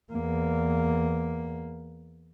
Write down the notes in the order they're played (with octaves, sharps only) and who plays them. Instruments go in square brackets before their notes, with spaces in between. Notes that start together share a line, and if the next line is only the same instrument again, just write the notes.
[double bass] E2 A#3